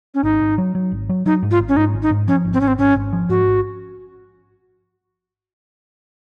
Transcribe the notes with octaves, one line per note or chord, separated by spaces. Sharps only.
C#4
G#1 D#4
G#1
F#3
F#3
G#1
F#3
F#3 D#4
G#2
F4
G#1
C#4
G#2 D#4
G#1
D#4
G#2
F3 C#4
G#1
C4
G#1 C#4
C4
G#1 C#4
G#1
F3
G#2 F#4
G#1